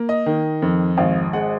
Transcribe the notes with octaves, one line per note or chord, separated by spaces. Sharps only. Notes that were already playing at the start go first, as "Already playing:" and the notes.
Already playing: A#3
D#5
D#3
F2
G#1 F5
G#3 F#5